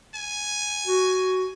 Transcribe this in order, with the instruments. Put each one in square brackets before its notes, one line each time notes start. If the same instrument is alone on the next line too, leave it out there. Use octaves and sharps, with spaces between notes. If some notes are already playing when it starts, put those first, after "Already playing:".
[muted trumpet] G#5
[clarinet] F#4